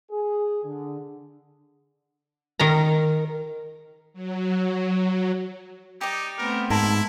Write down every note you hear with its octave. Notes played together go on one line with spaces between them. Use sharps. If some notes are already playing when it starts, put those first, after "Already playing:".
G#4
D3
D#3 A#4 D#5 A#5
F#3
D#4 G4 D5
A3 B3 C4 A#4
G#2 E4 A#4 A5 C6